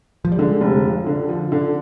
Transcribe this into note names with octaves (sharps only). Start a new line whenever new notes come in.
F3
G3
D3 G#3
F1
F3
D3
F3
D3